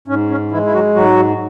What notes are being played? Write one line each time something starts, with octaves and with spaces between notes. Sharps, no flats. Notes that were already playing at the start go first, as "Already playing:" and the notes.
G#2 C#4
C#4
E3 G#3 E4
E4
F#3 F#4
G#2 F#3 F#4